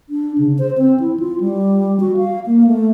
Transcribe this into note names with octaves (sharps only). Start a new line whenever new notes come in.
D4
C#3
C5
C4
E4
F4
G3
F#4
F5
A#3
A3